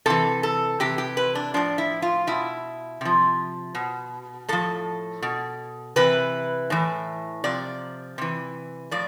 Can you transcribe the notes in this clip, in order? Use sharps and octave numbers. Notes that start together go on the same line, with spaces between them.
C3 E3 A4
A4
C3 E3 G4
G4
B4
D4
A2 F3 D4
E4
F4
B2 E4
C3 F3
B2
A2 F3 A4
B2
C3 E3 B4
A2 E3
C3 F3 D5
C3 E3
A2 F3 D5